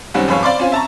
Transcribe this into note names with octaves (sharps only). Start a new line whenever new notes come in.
F#1 D#3 G3 C4 C#4 F#5
G#1 F2 G#4 B4 C#5 F5
C5 D5 F5 B5 C6 D6
C#4 F4 C5 G#5
E5 A5 A#5 C#6